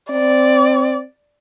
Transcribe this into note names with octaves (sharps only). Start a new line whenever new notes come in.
C4 D5